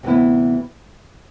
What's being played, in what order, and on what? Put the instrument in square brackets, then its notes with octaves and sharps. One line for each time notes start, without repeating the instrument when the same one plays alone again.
[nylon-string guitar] D2 C3 E3 B3 E4